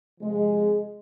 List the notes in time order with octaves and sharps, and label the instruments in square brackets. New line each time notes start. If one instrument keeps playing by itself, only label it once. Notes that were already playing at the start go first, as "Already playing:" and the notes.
[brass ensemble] C3 F3 G#3